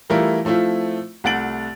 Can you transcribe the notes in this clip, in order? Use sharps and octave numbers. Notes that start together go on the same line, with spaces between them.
E3 G3 A3 E4 F4 A#4
F3 A3 C4 E4 F4
C2 A3 F#5 A6 D7 F#7